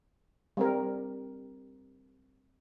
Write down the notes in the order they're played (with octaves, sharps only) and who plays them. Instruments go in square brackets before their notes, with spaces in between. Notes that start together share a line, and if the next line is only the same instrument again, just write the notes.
[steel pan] G3 C4 A#4